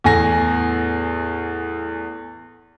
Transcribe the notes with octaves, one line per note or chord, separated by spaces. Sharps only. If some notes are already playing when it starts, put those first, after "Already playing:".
E2 A2 G#5 A#6